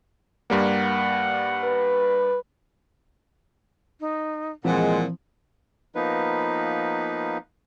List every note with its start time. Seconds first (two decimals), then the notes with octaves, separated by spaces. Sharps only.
0.50 G2 G3 A#3 F#5
1.63 B4
4.00 D#4
4.64 A#2 E3 F3 G#3 C4 F#5
5.95 F3 A#3 B3 D#4 B4